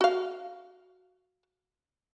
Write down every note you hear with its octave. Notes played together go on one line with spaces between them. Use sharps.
F#4 F5